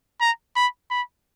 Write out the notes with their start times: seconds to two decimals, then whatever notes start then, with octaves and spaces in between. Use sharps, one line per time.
0.21 A#5
0.56 B5
0.91 B5